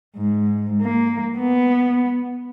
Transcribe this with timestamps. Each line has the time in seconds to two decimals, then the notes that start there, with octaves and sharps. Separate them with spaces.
0.18 G#2
0.82 A#3
1.39 B3